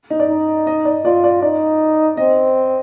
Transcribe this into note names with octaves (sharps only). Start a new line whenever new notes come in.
D#4
D5
D#4
D#5
D5
F4 D5
D5
D#4 D5
C4 D#5